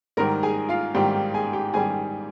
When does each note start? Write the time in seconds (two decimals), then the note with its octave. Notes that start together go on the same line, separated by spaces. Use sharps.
0.17 G#2 D#3 G3 A#4 A#5
0.43 G#4 G#5
0.69 F4 F5
0.95 G#2 D#3 G3 G4 G5
1.34 G#4 G#5
1.53 G4 G5
1.74 G#2 D#3 G3 G#4 G#5